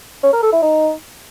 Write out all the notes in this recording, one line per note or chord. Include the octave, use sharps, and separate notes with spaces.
C#4
A#4
A4
E4
D#4